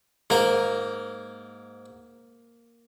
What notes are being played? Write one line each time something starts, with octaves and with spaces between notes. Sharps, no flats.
G#2 A#3 A#4